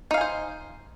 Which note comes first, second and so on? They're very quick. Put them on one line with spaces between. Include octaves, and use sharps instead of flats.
D#4 F5 G#5 C5